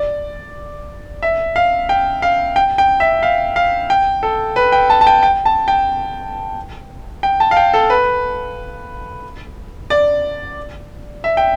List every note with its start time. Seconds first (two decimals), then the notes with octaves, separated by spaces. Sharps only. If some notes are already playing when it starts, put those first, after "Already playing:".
Already playing: D5
1.23 E5
1.56 F5
1.89 G5
2.22 F5
2.56 G5
2.78 G5
3.00 E5
3.23 F5
3.56 F5
3.90 G5
4.23 A4
4.56 B4
4.72 G5
4.90 A5
5.01 A5
5.07 G5
5.23 G5
5.45 A5
5.68 G5
7.23 G5
7.40 A5
7.51 F5
7.57 G5
7.74 A4
7.90 B4
9.90 D5
11.24 E5
11.37 G5